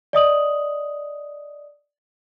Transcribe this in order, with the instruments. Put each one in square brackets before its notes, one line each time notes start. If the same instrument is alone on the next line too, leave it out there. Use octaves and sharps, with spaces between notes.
[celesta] D5 D#5 D#6 F#7